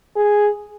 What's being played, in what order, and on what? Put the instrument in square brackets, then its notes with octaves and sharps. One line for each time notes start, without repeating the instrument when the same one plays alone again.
[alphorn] G#4